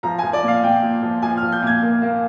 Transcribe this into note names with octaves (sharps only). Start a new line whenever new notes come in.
F3 A#5
F3 G#5
D5
A#2
F5
A#2 G5
A#2
F3
F3 G#5
F3 F6
G6
A#2 G#6
A#3
A#3